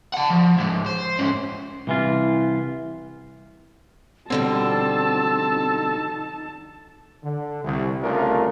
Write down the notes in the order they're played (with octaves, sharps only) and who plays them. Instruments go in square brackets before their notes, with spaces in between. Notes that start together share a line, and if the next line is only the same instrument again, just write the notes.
[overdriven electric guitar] F#5 A5
F3
C#2 G#2
C5
G#2 C#4
[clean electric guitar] C2 E3 F4
[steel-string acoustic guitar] B2 D3 G3 [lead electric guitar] C4 [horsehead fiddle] D#4 A5 [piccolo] E6
[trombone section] D3
C2
C2 C#3 A3 D4 F4 A#4